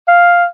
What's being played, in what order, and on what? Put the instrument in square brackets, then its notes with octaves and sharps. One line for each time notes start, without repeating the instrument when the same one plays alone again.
[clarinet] F5